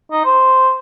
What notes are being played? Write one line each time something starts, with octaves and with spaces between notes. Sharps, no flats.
D#4
C5